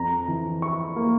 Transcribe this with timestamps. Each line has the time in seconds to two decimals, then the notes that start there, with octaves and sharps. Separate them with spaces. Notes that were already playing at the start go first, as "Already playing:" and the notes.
Already playing: F2 A#5
0.28 E3
0.62 E4 C#6
0.96 A#3